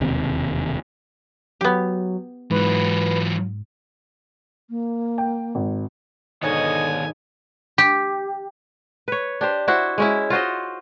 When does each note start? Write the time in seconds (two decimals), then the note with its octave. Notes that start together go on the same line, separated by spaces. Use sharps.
0.01 E1 D#2 C3
1.61 F#3 B3 G4
2.51 G#2 E3 F#3 B4
4.70 A#3
5.18 G5
5.55 G#1
6.43 G#2 B2 D3 D#3 C#5 D#5 G#5
7.78 G4
9.08 B4 C#5
9.41 D4 G4 C5
9.68 E4 F#4 C5 F#5
9.98 G#3 C#4 E4
10.30 F4 F#4 C5 D#5